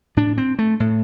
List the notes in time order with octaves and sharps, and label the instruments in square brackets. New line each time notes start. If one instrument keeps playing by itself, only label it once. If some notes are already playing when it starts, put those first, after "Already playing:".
[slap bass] A2 D4
C4
A3
A2